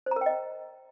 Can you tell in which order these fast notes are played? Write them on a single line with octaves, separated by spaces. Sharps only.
C5 A#5 A#4 G5 D#5